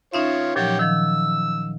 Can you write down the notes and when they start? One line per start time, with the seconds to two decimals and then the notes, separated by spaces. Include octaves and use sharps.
0.14 C#4 D#4 F4 C#5 E5
0.56 A#2 F3 F#3 G4 C#5 G5
0.79 D#3 F3 E6